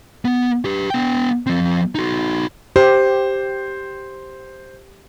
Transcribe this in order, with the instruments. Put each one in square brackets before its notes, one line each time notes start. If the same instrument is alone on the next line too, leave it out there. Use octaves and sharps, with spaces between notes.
[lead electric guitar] B3
G4 B4
B3 G5
F3 C4
D#4 F#4
[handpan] G4 [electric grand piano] C5